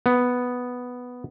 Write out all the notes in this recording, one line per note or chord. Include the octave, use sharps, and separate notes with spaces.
B3